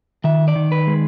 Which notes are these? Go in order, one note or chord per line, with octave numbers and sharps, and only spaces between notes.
D#3 E5
D5
D#3
B4
G#3